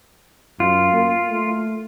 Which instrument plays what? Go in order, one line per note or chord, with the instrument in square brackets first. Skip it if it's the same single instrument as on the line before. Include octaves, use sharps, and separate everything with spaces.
[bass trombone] F#2 [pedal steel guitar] F4
[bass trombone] A#3
A3